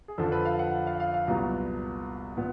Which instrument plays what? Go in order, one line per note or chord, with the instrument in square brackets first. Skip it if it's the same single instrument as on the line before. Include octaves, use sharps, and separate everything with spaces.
[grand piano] G#4
F2 D3 F3 A4
B4
F5
F#5
F5
F5
F5
F5
C2 A#2 F#3 B3 A#5
A#2 B3